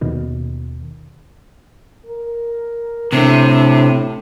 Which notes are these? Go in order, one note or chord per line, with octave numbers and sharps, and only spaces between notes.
D#2 B2 D#3
A#4
A2 C3 D4